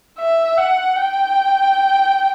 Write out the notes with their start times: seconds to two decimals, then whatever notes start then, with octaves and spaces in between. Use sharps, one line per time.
0.19 E5
0.57 F#5
0.95 G5